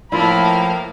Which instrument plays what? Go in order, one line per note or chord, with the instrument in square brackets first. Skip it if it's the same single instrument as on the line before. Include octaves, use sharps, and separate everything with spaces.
[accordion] A2 F3 [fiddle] A#3 F5 [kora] E4 F4 [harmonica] B5